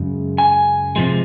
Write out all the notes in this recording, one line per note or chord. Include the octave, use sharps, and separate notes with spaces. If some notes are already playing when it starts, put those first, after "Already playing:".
Already playing: F#2 C#3 G#3
G#5
C3 F3 G#3